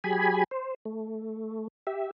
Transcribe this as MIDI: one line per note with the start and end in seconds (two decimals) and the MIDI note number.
0.04 0.44 54
0.04 0.44 67
0.04 0.44 68
0.04 0.44 80
0.04 0.44 83
0.51 0.74 72
0.85 1.68 57
1.87 2.11 67
1.87 2.11 76